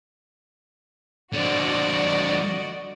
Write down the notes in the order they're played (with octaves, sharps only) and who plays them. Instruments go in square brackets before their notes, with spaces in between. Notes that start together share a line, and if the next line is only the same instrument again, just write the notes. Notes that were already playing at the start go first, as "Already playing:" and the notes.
[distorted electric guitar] D3 F3 [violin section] F#4 D5 D#5